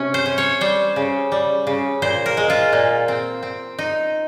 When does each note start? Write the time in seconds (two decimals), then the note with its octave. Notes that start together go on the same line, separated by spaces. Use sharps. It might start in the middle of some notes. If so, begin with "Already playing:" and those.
Already playing: C3 C#4
0.14 C5
0.26 C#4
0.38 C#5
0.61 G3 C5
0.96 C#3
1.32 G3
1.67 C#3
2.02 A#2 C5
2.26 A#4
2.37 G#3
2.50 F4
2.73 A#2
3.08 C4
3.43 C4
3.79 D#4